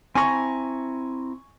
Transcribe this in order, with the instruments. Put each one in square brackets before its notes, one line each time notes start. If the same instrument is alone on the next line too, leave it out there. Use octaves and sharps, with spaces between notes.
[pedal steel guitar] C4 E4 A#5 [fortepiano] G#5 C#6